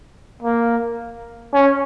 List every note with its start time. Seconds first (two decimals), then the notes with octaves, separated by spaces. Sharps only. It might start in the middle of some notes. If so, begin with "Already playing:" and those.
0.43 A#3
1.53 C#4